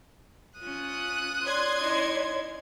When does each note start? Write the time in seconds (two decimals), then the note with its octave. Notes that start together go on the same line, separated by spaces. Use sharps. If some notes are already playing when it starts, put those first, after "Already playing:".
0.59 C#4 F4 D#6 F#6
1.45 C#5 D5 C6 G#6
1.77 C#4 D#4 E4